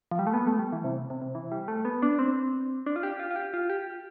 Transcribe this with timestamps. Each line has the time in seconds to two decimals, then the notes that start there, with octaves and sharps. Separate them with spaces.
0.11 F3
0.19 G3
0.27 A3
0.34 B3
0.47 A3
0.59 G3
0.73 E3
0.84 C3
1.10 C3
1.22 C3
1.35 E3
1.52 G3
1.68 A3
1.85 B3
2.02 D4
2.19 C4
2.86 D4
2.96 F4
3.03 G4
3.19 F4
3.31 F4
3.36 G4
3.54 F4
3.70 G4